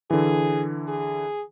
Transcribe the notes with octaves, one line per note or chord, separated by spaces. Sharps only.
D3 E3 G#4
G#4